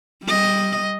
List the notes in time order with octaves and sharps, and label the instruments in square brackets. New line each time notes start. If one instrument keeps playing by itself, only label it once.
[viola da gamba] G3 D#5